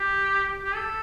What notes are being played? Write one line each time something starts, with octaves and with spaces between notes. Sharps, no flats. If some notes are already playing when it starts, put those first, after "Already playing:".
Already playing: G4
G4
A4